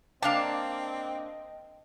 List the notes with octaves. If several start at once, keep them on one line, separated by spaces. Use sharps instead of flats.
A#3 C4 D4 D5 D#5 F5 A5